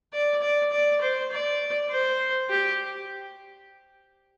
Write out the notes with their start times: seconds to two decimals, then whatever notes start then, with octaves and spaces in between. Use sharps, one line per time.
0.13 D5
0.42 D5
0.72 D5
1.01 C5
1.31 D5
1.90 C5
2.50 G4